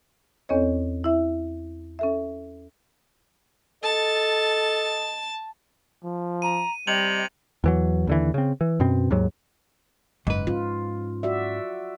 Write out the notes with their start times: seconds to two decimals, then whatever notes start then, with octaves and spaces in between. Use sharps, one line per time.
0.49 E2 C4 C#4 A4 C#5 D#5
1.04 E4 E5
1.99 C#4 A4 E5
3.83 A4 D#5 A5
6.04 F3
6.42 A#5 D#7
6.87 C3 G3 D#5 F7 F#7
7.64 E2 E3 F#3
8.07 D#2 D3 E3
8.34 C#3 C4
8.61 E3
8.80 F#2 B2 C4
9.11 D#2 G#2 F#3
10.27 F#1 G#2 B4
10.47 C#4 F4
11.23 F#4 D5 E5